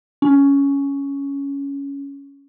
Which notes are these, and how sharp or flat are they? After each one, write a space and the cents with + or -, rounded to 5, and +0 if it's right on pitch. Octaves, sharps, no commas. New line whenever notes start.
C#4 +10